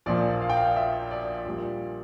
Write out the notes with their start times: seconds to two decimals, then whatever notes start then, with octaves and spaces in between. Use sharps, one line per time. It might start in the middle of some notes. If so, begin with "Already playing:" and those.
0.06 A#1 A#2 F3 D5
0.42 F5
0.49 G5
0.57 F5
0.76 E5
1.11 D5
1.46 A#1 A#2 G3